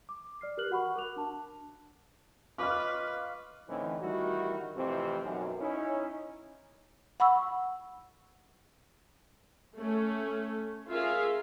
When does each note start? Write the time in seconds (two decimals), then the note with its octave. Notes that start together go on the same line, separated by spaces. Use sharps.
0.09 D6
0.41 D5 F6 C7
0.57 G4 A#4 B4 F6 F#6 F#7
0.71 F#4 F#5 B5 C#6
0.96 A#4 D6 F#6 F7
1.16 D4 A5
2.58 F4 B4 C#5 D#5 D6 F6
3.68 A2 D3 E3 C4 C#4 D#4
4.01 A1 D#3 G3 E4 F#4
4.76 F2 A2 C3 E3 C4
5.23 B1 F#2
5.60 C#4 D#4 E4
7.20 F#5 B5 C#6 E6
9.77 A3 C#4
10.89 C#4 F4 G#4 A#4 E5 F5